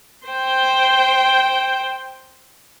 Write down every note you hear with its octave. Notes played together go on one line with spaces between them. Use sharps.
C5 G5